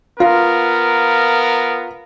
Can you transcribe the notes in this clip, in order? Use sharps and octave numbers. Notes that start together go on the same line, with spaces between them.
B3 F4 A#4